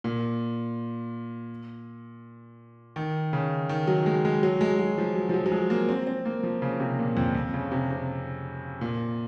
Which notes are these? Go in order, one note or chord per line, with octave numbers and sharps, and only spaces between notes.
A#2
D#3
C#3
D#3
F#3
G#3
G#3
F#3
G#3
F#3
F3
F#3
F3
F#3
F#3
G#3
A#3
C4
C4
A#3
F3
C#3
C3
A#2
F2
F2
C#3
C3
C3
A#2